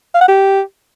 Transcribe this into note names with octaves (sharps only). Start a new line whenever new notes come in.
F5
F#5
G4